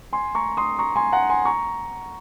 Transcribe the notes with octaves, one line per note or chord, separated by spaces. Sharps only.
G#5 C6
A#5 C#6
C6 D#6
A#5 C#6
G#5 C6
F#5 A#5
G#5 C6
A#5 C#6